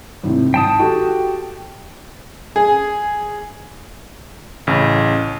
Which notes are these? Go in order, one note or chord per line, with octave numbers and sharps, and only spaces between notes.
G#1 A2 C3
G#1 G5 A5 D#6
F#4 G4 A4
G#4
A1 C#3